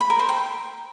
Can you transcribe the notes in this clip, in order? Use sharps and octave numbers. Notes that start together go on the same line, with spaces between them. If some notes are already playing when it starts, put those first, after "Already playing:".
B5
A#4
C5
G5